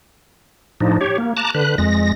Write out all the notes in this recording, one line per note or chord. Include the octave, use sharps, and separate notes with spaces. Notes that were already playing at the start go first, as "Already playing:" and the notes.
A2 F3 D4 D#4
G4 C#5
A#3
A5 A#5 D6 F#6
D3 B4 F#6
F2 G#3 A#6